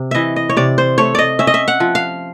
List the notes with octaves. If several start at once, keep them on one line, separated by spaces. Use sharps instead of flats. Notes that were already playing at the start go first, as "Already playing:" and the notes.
Already playing: C3
E3 D#5 E5
D#5
C#5
C3 D5
C5
A3 C#5
D5 D#5
C#4 E5
D#5
E5
F#5
F3
F5